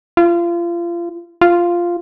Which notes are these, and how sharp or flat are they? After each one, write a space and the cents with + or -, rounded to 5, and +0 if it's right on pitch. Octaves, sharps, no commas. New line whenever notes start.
F4 -30
F4 -5